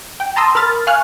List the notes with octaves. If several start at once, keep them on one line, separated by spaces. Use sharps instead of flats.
G5
A5 A#5 C6 D#6 E6
A#4 B5 F6 A6
F5 G#5 C#6 F6 F#6